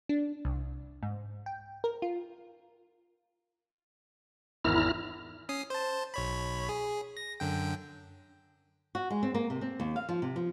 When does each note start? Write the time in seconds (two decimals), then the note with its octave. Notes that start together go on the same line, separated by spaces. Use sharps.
0.09 D4
0.45 C2
1.03 G#2
1.46 G5
1.84 A#4
2.02 F4
4.65 G#1 E2 D#3 E4 A#5 F6
5.49 C#4 D#6 C7
5.70 C5 A5
6.14 B1 C#5 B5
6.69 G#4
7.17 A#6
7.40 F#2 D3 G5
8.95 F#4
9.10 G#3
9.23 C4
9.34 A#3
9.50 C3
9.61 C4
9.80 D#2
9.96 F5
10.09 F3
10.22 C3
10.36 F3